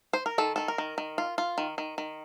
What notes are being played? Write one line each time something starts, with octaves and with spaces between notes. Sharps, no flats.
C5
A#4
D#3 A4
D#3 A4
A#4
D#3
D#3
F4
F4
D#3
D#3
D#3